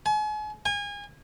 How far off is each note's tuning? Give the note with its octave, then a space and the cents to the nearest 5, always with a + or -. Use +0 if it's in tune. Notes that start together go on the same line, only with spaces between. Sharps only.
G#5 +40
G#5 -30